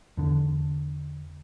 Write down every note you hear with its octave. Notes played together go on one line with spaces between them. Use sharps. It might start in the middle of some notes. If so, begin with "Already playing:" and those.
E2 D3